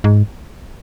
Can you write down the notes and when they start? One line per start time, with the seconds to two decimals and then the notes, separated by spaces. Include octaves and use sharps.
0.04 G#2